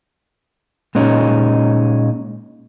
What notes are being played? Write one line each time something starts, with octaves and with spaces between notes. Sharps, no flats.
A#2 G#3 C#4 D#4